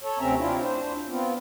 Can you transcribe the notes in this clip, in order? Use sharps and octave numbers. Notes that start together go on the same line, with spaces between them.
A4 C#5
D2 C3 C4 C#4 E5 A#5
C4 D4 E4 F4
D4 C5
B3 C4 F4